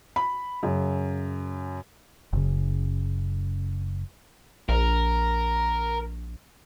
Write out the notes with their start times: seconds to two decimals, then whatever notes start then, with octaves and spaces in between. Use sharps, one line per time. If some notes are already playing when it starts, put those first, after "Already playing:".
0.16 B5
0.63 F#2 C#3
2.33 F#1 C#3
4.69 A#1 A#4